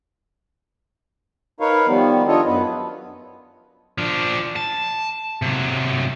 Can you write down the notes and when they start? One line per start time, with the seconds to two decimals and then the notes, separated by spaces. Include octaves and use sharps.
1.60 D#4 A#4 B4 C#5 F5
1.87 D#3 F3 G3 B3
2.28 D4 F4 A4 C#5 D#5
2.46 F#2 B3 B4
3.98 F3 D4
4.56 A5
5.42 C3 F#3